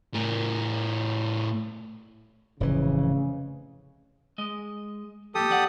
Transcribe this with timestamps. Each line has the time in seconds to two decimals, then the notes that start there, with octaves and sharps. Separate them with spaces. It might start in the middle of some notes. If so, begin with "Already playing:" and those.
0.14 A2 A#4
2.60 F1 A2 C#3 E3
4.38 G#3 D#5
5.35 F2 A#2 G4 A4 D#6
5.50 F2 D5 F#5